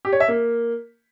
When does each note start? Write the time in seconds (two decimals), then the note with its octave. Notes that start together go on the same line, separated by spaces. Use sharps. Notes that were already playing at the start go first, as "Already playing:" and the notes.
0.05 G4
0.13 C#5
0.20 E5
0.28 A#3